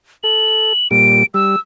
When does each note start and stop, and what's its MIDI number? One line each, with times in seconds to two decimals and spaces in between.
0.24 0.73 69
0.24 0.88 102
0.91 1.23 46
0.91 1.23 55
0.91 1.26 98
1.34 1.56 55
1.34 1.59 88